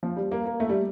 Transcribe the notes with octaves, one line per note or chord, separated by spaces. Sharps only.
F3
G3
A#3
A#3
A3
G3